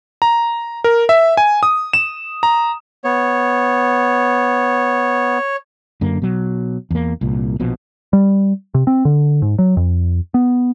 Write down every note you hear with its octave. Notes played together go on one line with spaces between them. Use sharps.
A#5
A#4
E5
G#5
D#6
E7
A#5
B3 C#5
F#2 D3 A#3
B2 F#3
E2 A#3
C2 A#2
A#1 B2 F3
G3
C3
C4
D3
G#2
F#3
F2
B3